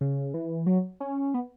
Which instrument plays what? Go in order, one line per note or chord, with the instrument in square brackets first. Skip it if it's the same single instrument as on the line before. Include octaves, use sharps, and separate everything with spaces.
[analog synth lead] C#3
E3
F#3
C#4
B3